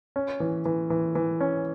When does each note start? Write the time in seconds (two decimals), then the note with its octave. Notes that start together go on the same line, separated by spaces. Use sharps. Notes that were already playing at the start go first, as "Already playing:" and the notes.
0.16 C#4
0.40 E3
0.65 E3
0.90 E3
1.15 E3
1.41 C#4